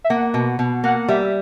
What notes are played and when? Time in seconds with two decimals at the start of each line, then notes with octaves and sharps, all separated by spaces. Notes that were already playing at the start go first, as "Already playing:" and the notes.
0.04 E5
0.10 A#3 F#5
0.34 B2
0.59 B2
0.84 A#3 F#5
1.09 G3 E5